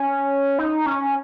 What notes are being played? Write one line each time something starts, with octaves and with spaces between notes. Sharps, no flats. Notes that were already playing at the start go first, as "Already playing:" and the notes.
Already playing: C#4
D#4
C#4